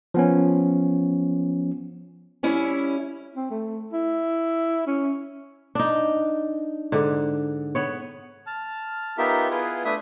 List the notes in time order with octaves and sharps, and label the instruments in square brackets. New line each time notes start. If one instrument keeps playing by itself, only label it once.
[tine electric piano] F3 B3 C#4
[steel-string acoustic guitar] G3 C#4 E4
[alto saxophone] C4
A3
E4
C#4
[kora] D4 D#4
G#2 D3
B3 C#5
[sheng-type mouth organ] A5 F6
B3 D#4 F4 G4 A#4 E5
B3 E4 F4 G#4 B4
A3 D4 B4 E5 D#6